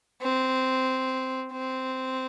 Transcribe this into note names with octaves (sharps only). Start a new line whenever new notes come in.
C4
C4